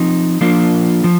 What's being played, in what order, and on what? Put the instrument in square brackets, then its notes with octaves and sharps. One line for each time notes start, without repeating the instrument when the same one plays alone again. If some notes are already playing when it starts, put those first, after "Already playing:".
Already playing: [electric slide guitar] F3 C4 D#4
F3 A#3 D4 F4
F3